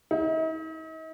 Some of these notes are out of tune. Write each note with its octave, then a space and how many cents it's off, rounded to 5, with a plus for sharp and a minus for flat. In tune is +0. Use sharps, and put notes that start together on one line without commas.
D#4 +45